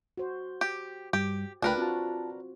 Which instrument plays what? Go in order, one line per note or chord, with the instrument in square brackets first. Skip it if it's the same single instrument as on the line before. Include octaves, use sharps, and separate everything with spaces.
[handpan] F#4 C5
[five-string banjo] G4
[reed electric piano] G2 G3 [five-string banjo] G4
[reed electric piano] C#2 A3 G5 [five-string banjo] D4 A#4 B4 [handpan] F4
[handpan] C4 F#4 [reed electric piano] F4 A5